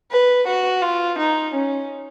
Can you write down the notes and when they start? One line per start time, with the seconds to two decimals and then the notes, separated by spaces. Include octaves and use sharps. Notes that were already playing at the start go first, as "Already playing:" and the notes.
0.11 B4
0.47 F#4
0.82 F4
1.18 D#4
1.54 C#4